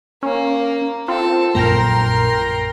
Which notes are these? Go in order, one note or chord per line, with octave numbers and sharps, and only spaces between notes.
A#3 C#4
C4 F4 A4
A#1 F#2 A#3 A#4 G5 A#5 C6